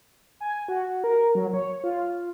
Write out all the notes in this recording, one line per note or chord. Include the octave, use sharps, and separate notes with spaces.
G#5
F#4
A#4
F#3
C#5
F4